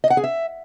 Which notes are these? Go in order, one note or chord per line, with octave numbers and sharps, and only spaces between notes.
D#5
F#5
G#4
E5